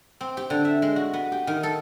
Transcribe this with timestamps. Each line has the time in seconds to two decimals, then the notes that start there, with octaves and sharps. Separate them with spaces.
0.21 C4
0.37 G4
0.50 D3
0.65 E5
0.82 G#3
0.96 F#4
1.13 B3
1.32 G4
1.47 D#3
1.63 A4